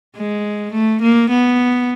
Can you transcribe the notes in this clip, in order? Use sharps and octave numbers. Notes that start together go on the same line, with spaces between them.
G#3
A3
A#3
B3